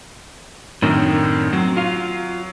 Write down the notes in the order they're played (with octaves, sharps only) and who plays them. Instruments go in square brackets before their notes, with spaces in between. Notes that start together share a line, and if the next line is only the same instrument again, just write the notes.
[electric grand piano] F#2 D#3 [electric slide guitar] A2 C4 D4
[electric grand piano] F#3 [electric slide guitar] C4
[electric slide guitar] F4 F5